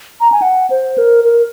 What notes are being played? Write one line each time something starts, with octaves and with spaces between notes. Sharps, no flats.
A#5
G#5
F#5
C5
A#4
A#4